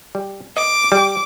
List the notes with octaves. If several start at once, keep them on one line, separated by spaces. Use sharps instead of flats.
G3
D#5 D6
G3